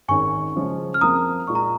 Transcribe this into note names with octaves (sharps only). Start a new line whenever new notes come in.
G#1 G#2 D#3 C#4 G#4 G#5 C#6
C#3 F3 G#3 C#4
F6
F2 F3 A#3 A#5 D#6
A#2 G#3 F4 C#6
A#5